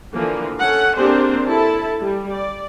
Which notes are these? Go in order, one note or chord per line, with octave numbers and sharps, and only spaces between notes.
D3 E3 F3 A#3
C#4 A4 F#5
A#3 C4 D4 G4 G#4 C5
E4 A4 A5
G3
D5